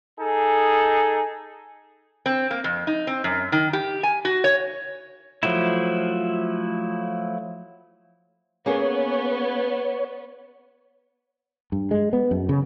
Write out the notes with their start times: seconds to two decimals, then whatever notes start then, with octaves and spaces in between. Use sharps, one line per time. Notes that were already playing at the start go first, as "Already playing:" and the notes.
0.19 D#4 G#4 A4
2.26 C4
2.51 A#3
2.64 F2
2.87 D#4
3.07 C4
3.24 F#2
3.52 D#3
3.73 G4
4.03 G#5
4.25 F#4
4.44 C#5
5.43 F3 F#3 A3 E4
8.66 A#3 B3 C#4 G#4 C#5
11.72 G2
11.91 G#3
12.13 B3
12.31 F#2
12.49 C#3